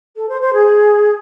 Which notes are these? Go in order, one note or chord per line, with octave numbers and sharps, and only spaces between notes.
A4
C5
C5
G#4